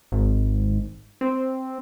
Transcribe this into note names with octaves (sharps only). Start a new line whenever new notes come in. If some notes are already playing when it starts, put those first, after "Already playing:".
G#1
C4